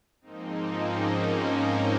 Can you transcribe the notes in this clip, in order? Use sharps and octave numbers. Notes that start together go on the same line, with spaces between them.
G#2 F3 A#3 C4 D#4
A#3 C#4